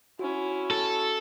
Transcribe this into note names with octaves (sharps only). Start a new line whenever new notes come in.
C#4 E4 F#4
A4